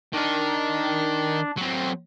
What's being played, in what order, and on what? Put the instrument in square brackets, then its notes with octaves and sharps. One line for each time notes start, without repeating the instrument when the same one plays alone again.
[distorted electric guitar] D#3 A#4 [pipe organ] D4
[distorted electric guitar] F#3 C4